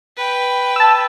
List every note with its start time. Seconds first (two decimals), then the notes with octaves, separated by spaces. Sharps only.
0.17 B4 G5
0.76 A5 E6